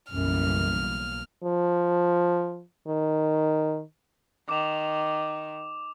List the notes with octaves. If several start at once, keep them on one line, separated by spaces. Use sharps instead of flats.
B1 F#2 C#3 E3 G3 A#3 F6
F3
D#3
D#3 D6 E7 F7